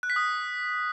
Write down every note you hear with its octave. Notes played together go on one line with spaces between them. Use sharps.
F#6
B6
D#6